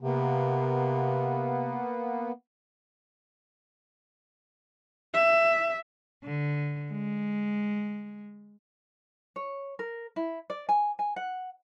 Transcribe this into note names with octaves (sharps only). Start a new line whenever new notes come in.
C3 A#3 B3
E5
D3
G#3
C#5
A#4
E4
D5
G#5
G#5
F#5